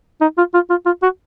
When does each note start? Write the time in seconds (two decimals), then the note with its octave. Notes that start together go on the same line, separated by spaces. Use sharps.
0.21 D#4
0.38 F4
0.54 F4
0.70 F4
0.86 F4
1.03 F#4